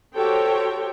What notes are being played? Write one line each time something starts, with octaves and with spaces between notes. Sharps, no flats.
F#4 G4 A4 C5 C#5 G5